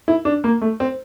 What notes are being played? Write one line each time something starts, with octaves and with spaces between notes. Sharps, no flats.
E4
D4
A#3
A3
C4